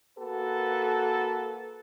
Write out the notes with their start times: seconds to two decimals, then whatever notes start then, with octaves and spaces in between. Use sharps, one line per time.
0.19 A#3 F#4 A4 B4